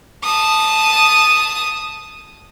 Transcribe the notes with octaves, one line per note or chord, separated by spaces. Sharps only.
A5 D#6